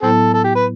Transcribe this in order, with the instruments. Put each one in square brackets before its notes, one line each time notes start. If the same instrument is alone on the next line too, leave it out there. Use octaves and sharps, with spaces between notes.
[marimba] A2 F#3 B3 E4 [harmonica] C4 A4
[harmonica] A4
G4
B4